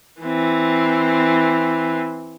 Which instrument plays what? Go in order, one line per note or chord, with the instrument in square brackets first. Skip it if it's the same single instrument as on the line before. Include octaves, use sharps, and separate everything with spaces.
[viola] E3 C4